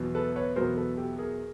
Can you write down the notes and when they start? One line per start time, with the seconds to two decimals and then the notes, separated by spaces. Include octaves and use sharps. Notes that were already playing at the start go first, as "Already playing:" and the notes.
Already playing: E2 B2 F#3 B3
0.15 A4 B4
0.36 B4 C#5
0.56 E2 B2 F#3 B3 A#4 C5
0.77 A4 B4
0.97 G4 A4
1.19 G#4 A#4